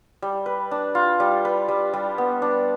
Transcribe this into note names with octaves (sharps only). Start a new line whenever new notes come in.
G3
B4
D4
F4
G3
B4
G3
G3
B3
D4